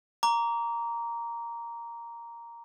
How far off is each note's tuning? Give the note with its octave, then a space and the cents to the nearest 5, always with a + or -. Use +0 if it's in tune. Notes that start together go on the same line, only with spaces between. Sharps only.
A#5 +0 D6 -30